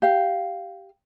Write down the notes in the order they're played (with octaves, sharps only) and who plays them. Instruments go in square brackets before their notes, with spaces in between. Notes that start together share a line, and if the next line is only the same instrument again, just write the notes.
[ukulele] G4 F5